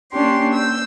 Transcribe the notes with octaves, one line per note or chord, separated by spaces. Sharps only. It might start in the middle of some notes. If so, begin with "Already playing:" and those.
A#3 C#4 D4 G4 C6
E6 G6